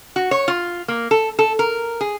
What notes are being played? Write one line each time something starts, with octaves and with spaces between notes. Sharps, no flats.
F#4
C#5
F4
A#3
A4
A4
A#4
G#4